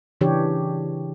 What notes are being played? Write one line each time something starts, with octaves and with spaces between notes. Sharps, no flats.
C#3 E3 D4 G4 C#5